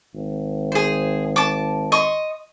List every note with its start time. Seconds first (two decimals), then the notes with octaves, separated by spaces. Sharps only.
0.14 G#1
0.72 G#4 C5
1.36 A5 D6
1.92 D#5 C6 C#6